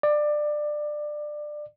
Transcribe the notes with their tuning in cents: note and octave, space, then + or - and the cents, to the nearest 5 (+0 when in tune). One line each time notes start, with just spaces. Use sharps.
D5 +20